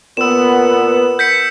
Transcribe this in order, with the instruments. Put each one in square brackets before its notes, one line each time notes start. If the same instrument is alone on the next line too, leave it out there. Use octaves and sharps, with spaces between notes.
[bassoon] A#2 [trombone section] B3 [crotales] E6 E7
[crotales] G6 B6 C#7